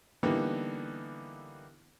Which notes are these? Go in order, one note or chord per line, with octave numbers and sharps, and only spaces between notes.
D3 E3 G3 A#3 B3 D#4